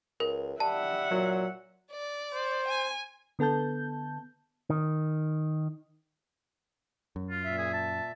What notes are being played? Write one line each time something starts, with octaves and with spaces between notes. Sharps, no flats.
C#2 A#4
G3 E5 F#5 A5
A#2 F#3
D5
C5
G#5
D3 B3 A4 A5 G6
D#3
F#2
F4
A#2 E5
G#4
A5